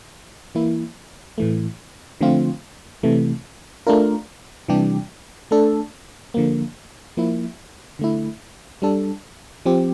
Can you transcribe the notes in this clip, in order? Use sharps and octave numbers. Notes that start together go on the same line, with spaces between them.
E3 A#3 E4
A2 E3 A3
D3 F3 A3 C4 F4
C3 E3 A3
A3 D4 F4 A#4
C3 E3 G3 D4 G4
A3 D4 A4
D3 F3 A#3
F3 A#3 E4
D3 A3 E4
G3 D4 A4
F3 C4 G4